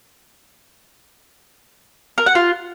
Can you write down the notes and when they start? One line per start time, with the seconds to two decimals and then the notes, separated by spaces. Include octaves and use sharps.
2.18 A#4
2.26 F#5
2.35 F4